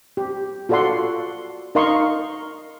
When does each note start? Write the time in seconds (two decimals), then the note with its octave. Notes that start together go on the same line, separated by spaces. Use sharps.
0.17 G4
0.69 F4 F#4 A4 D5 F#5 C6
1.75 D#4 A#4 D#5 F5 C6 C#6